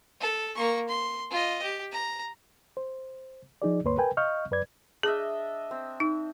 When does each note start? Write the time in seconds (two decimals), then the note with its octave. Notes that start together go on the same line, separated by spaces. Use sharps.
0.20 A4
0.56 A#3 C#6
0.89 C6
1.31 F4 D#5
1.63 G4
1.92 A#5
2.77 C5
3.62 F3 D#4 G#4 D5
3.84 D2 G2 A#3 B4 C#5 C6
3.98 A#4 B4 G5 G#5
4.17 D#5 F5 C#6 F6 G6
4.51 F#2 B4 D5 G#6
5.03 D4 G#4 D#5 E5
5.71 C4
6.00 D#4